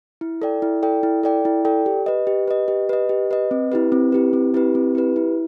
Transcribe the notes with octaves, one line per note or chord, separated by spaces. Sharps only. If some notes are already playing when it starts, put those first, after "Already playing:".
E4
A4 D5 G5
E4
A4 D5 G5
E4
A4 D5 G5
E4
A4 D5 G5
G4
B4 D#5
G4
B4 D#5
G4
B4 D#5
G4
B4 D#5
C4
E4 G4 B4
C4
E4 G4 B4
C4
E4 G4 B4
C4
E4 G4 B4
E4